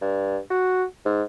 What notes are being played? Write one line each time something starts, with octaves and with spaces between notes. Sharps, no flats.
G2
F#4
G#2